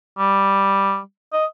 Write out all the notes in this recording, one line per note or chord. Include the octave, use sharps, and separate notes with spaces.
G3
D#5